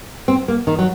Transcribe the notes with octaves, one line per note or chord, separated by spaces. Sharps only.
C4
A#3
D#3
F#3